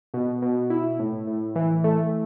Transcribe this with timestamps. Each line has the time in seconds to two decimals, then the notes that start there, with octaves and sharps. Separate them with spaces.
0.14 B2
0.42 B2
0.70 E4
0.99 A2
1.27 A2
1.56 E3
1.84 A3